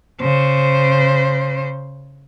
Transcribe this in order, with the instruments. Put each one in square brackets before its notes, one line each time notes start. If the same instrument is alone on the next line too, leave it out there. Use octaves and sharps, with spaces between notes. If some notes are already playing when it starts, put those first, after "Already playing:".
[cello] C#3 C5